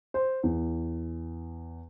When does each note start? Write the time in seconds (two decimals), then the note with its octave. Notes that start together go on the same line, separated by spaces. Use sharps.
0.14 C5
0.43 E2